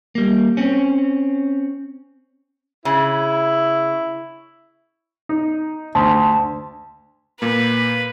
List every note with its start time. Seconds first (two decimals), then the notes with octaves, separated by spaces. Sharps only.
0.15 G3 A#3
0.57 C4 C#4
2.85 C#3 E4
5.29 D#4
5.95 D2 A5 C6
7.42 A#2 A#3 B4